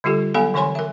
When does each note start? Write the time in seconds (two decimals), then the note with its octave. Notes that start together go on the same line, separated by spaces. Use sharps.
0.04 D3 G3 F4 G4 A4
0.34 F#3 B3 A4 F5 G#5 B5
0.54 D3 E3 C#5 G#5 B5 C6
0.75 A#4 E5